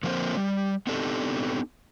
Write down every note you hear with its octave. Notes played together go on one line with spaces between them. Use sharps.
D3 F3 A#3 C4 A#4 C5
G3
B3 C4 D4 D#4 G4 A4